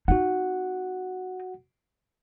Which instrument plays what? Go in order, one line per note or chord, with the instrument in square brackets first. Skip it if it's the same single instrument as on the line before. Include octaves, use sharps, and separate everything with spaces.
[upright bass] C4 D#4 [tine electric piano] F#4 F#5